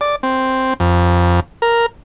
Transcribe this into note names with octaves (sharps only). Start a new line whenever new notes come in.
D5
C4
F2
A#4